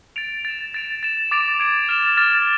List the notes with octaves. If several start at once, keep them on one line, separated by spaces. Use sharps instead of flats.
A6 D7 F7
A6 E7
A6 D7 F7
A6 E7
D6 A6 D7 F7
G#6 D7 F7
F6 A6 E7
D6 F6 A6